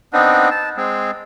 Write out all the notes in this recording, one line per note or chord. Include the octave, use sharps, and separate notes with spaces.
B3 C4 D4 D#4
A5
G#3 C4